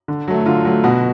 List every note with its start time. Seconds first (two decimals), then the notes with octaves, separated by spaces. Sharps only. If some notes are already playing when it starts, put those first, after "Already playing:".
0.08 D3
0.28 F#3 A3
0.46 D3 F4
0.65 F#3 A3
0.84 B2 F#4